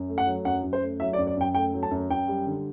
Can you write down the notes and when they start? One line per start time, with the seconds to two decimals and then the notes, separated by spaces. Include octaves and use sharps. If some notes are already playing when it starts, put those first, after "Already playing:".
Already playing: F#2
0.09 A3
0.18 F#5
0.26 F#3
0.45 F#2 F#5
0.63 F#2
0.73 C5
0.81 A3
1.00 F#3 E5
1.13 D5
1.18 F#2
1.27 D5
1.37 F#2 G5
1.55 A3 G5
1.74 F#3
1.83 A5
1.91 F#2
2.10 F#2 G5
2.28 G3
2.46 D3